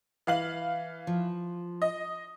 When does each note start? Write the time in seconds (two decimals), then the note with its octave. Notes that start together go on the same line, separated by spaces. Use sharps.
0.27 E3 F5 F#7
1.07 F3
1.82 D#5